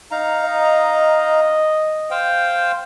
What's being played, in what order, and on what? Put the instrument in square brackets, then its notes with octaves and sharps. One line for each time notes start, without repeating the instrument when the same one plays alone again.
[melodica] D#4 F5 A#5
[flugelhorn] D#5
[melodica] C5 F5 G5